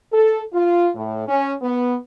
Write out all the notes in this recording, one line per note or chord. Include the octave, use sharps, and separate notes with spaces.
A4
F4
A2
C#4
B3